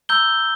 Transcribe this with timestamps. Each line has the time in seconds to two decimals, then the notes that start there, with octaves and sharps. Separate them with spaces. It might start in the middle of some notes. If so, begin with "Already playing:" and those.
0.09 A#5 E6 G6 G7